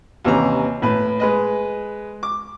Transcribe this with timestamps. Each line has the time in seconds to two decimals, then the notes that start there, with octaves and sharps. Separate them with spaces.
0.25 D#2 C3 E3 C#4 A#5
0.82 A2 B4
1.20 G#3 B4 D#5
2.23 D6